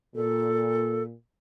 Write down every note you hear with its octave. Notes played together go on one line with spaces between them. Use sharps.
A#2 A4